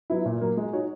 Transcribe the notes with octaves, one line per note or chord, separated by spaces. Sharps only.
F#3 B3 E4
A#2
F#3 A#3
G#3
D#4 F#4 C#5